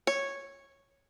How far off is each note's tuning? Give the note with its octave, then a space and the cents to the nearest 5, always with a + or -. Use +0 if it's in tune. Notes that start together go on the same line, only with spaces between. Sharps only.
C#5 -5